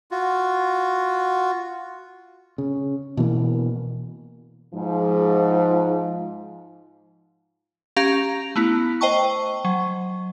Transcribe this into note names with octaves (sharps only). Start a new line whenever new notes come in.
F4 F#4
C#3
B2 E3 A#3
G#2 F3
C#4 G4 F5 A#5 A#6 F7
A3 B3 E4
C5 D#5 G5 A5 C#6
F#3